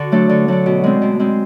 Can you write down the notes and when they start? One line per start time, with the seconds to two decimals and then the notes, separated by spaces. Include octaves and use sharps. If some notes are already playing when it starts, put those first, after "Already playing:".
Already playing: D3 F#4
0.12 F#3 A3 D4
0.29 D3
0.48 F#3 A3 D4
0.66 B2
0.84 G#3 C4
1.02 B2
1.19 G#3 C4